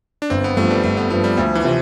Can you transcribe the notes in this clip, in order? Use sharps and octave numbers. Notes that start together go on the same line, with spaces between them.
D4
G1 C4
B3
G2 F3 A3
G3
G1 A3
B3
G2 F3 B3
G3
D2 F3
E3
C3 F3 C4